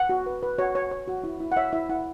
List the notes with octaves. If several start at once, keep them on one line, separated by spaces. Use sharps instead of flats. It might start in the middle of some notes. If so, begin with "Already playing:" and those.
Already playing: F#5
F#4
B4
B4
F#4 C#5
C#5
C#5
F#4
E4
E4
F#5
C#5 E5
E4 E5
E4 F#5